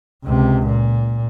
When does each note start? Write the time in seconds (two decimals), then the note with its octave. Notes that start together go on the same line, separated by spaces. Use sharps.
0.25 C#2 C3
0.66 A#2